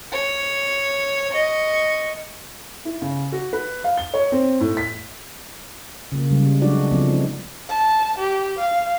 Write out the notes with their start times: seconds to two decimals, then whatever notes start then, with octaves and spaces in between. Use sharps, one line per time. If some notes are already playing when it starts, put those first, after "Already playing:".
0.12 C#5
1.31 D#5 C#6
2.85 E4
3.02 C#3
3.32 F#4
3.53 B4
3.84 F5
3.98 G7
4.14 C#5
4.32 C4
4.60 A2
4.77 B6
6.12 C#3 A#3
6.30 C#3 G3 G#3
6.62 F#3 G#3 D4 D#4 F#4 D5
6.91 C#3 F3 A3 B3 C4
7.12 D#4
7.69 A5
8.18 G4
8.58 F5